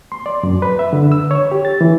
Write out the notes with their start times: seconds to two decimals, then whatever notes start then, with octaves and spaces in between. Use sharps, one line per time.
0.12 C6
0.26 D5
0.43 F#2
0.62 B4
0.79 E5
0.93 D3
1.12 E6
1.31 C#5
1.52 G4
1.65 A6
1.81 E3